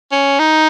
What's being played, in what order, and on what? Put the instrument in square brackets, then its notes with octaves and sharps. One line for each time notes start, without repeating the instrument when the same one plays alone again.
[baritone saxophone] C#4
D#4